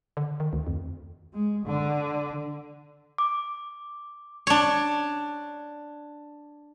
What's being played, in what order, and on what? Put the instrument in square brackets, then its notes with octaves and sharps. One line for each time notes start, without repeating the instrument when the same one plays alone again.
[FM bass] D3
D#3
D2
F2
[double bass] G#3
D3
[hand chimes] D6
[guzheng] D4 C#5